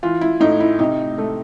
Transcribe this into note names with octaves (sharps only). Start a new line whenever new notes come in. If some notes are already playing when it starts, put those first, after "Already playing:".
E3 F4
E4
A2 D#4
E4
C3 D#4
A3